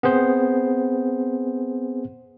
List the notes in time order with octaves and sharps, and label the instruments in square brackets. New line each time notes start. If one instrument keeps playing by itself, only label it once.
[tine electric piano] B3 C4 G#4 C5